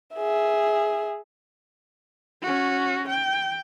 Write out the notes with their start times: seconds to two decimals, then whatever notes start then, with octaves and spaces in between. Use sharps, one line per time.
0.16 G#4 E5
2.42 C#4 F#4
3.08 G5